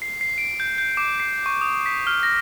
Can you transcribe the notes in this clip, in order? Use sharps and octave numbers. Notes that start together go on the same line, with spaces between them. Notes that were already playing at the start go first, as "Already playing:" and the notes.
C7
C7
D7
G6
G6
D6
C7
C#6
D#6
B6
F6
A#6